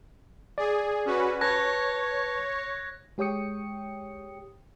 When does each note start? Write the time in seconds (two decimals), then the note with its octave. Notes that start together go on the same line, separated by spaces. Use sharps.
0.58 G#4 D5
1.05 C#4 F#4 B4
1.41 B4 C#5 A5 F#6 G#6 A#6
3.18 G#3 G4 C#5 G5 D#6 C#7